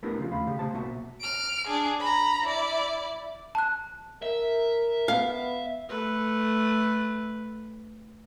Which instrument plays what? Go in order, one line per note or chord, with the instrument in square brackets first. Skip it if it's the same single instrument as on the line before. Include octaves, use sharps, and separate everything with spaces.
[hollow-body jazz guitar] A3 B3 D4 E4 G4 A#4
C#3 F3 F4
D#2 C#3 A3 F5 B5
C#3 G4 F5
C3 A3 C5 A5
B1 B2 A#3 F#4 A#4 E5
[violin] F6 D7
D4 G#4
A#5 B5
E4 D5
[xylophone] A5 F#6
[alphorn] A#4 [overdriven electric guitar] E5
[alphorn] B3 [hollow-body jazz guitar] F5
[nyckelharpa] A3 B4